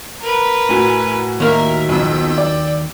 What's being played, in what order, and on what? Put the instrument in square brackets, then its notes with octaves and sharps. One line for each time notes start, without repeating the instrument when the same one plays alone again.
[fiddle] A#4 B4
[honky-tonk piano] A2 F#4 G#5
[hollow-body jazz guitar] D#2 A#3 [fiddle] A#4 E5
[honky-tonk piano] B1 F2 [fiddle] G5 E6
[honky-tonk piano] D5